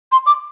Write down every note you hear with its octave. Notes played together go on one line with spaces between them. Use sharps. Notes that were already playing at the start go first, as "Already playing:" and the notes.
C6
D6